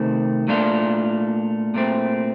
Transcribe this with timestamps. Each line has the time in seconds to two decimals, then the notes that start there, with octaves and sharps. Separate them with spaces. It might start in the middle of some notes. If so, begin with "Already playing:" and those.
Already playing: C3 D#3 A3 C4
0.48 A#2 A3 D4 F4
1.74 A#2 A3 C4